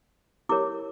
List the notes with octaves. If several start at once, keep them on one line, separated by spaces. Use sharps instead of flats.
E4 G4 A#4 C#5 D6